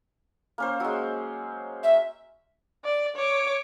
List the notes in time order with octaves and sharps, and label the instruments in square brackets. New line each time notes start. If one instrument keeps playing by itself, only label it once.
[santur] A#3 C#4 C5
F#3 G#3
[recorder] E5
[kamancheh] D5
C#5 D6